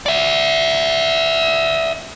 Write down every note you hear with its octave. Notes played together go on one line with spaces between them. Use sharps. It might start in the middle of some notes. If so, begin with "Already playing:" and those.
D5 E5